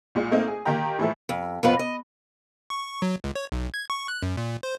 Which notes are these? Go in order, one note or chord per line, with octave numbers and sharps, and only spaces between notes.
C2 A#2 G#3
A3 A#3 C4 D#4
G#4
D#3 A#3 G4 G5 A#5
A2 E3 F3 G#3 E4 A4
F2
F2 A#2 B3 F4 B4
D#5
C#6
F#3
C#2
C#5
B1
G#6
C#6
F#6
F#2
A#2
C5